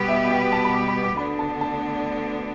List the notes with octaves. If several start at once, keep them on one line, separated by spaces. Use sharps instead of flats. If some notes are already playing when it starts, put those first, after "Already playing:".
Already playing: B2 G3 B3 G4 B4
E5
G5
A5
B5
D6
B5
D6
D2 D3 B3 D4 B5
A5
A5